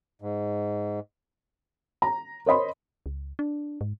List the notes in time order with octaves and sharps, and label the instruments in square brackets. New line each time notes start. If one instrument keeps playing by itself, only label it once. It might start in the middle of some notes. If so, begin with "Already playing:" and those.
[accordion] G#2
[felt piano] A#5
A#4 C5 C#5 D#5 B5 C6
[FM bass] C#2
D4
G#2